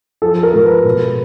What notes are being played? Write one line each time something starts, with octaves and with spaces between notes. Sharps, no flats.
F3 A4
A#4
G#2
B4
B2